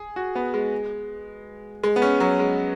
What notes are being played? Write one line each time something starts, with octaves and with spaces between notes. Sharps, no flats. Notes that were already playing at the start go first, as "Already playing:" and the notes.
Already playing: G#4
F#4
B3
G#3
G#3
B3
C#4
F#3
G#3